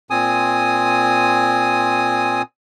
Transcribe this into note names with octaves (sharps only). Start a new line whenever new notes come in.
A#2 C4 G#5 D#6